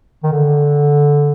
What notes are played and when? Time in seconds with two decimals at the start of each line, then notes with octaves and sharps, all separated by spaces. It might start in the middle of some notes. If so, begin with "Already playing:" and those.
0.23 D#3
0.32 D3